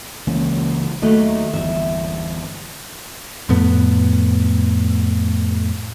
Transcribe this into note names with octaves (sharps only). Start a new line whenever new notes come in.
C#2 E3 A#3 C#4
D#2 F#3 A3 D#5
G1 E2 E5
F2 A2 B3